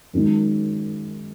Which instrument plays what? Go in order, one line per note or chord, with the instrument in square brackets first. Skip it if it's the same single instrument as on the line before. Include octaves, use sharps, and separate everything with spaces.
[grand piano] F#2 D#3 G#3 C#4